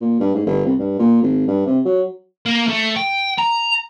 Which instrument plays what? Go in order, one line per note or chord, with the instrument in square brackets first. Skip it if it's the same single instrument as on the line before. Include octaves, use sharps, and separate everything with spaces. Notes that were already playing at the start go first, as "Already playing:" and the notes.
[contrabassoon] A#2
G2
G#2
G1
C2
G2
A#2
G#1
G2
C3
F#3
[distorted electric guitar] A#3
A3
G5
A#5